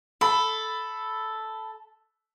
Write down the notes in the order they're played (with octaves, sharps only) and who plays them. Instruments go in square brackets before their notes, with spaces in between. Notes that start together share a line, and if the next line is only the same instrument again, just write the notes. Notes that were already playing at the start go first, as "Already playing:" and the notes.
[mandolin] A4 [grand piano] B5